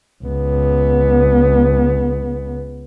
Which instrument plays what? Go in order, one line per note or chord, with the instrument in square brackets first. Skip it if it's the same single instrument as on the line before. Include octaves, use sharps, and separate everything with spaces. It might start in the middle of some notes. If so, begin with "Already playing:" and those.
[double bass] C#2 B3